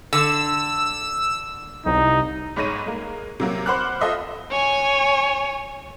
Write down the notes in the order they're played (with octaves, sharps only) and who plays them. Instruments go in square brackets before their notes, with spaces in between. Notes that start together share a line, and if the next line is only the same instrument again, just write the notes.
[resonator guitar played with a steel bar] D3 [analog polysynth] E6
[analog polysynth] C2 [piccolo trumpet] D#4
[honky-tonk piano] G1 G#2 C#5 A#6 D#7
G#3 A#3
C3 F#3 A#3
C5 F#5 B5 D6 F6 F#6
F4 A4 C5 D#5 E5
[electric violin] C#5 G#5